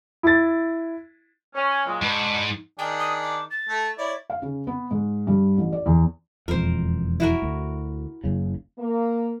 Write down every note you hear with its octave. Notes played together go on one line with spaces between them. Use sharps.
E4 A6
C#4
A#2 F#3 G#3
G#2 B2 D4 B4
D#3 D4 G#4 G5
D#6
D6
A6
A3
E4 C#5 D5
F5
C#3
B3
G#2
G2
A1
D5
E2
E1 F2 A#4 C5
E4 F#4 A#4
D2
F#1 C#3
A#3